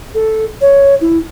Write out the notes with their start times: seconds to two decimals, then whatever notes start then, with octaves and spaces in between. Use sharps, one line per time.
0.14 A4
0.61 C#5
1.01 E4